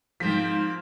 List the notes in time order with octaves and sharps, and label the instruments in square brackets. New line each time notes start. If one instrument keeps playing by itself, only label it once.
[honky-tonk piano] G#2 B6 [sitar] F3 A#3 C4